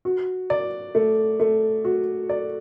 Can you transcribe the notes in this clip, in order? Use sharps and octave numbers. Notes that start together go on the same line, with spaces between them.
F#4
D5
A3
A3
F#4
D5